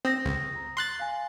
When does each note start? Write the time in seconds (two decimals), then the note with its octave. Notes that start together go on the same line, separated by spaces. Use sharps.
0.05 C4 D#6 A#6
0.25 C#2
0.56 A#5
0.77 C6 F#6 A6
0.99 F5 G#5